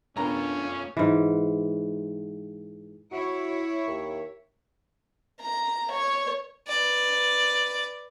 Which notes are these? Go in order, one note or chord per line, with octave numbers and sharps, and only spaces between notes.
A3 B3 C#4 D4 F4 A#4 A#5
G#2 E3
E4 F#4 C#5
D#2
A#5
C#5
B4 D5